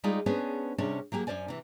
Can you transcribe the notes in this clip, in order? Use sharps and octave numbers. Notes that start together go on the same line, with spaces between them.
G3 G#3 D#4 F4 G#4 D5
B3 C#4 D4 G#4 B4 C5
C3 G3 C#4 D4 G#4
F#3 A#3 G4 G#4
F#2 C#4 C5 D5 G#5
C3 E3